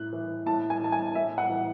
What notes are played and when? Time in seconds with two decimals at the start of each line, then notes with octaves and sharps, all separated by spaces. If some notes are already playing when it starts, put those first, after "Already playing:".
Already playing: A2 F#6
0.13 E3
0.46 A2 A5
0.70 G#5
0.82 E3 A5
0.92 G#5
1.15 A2 E5
1.38 F#5
1.50 E3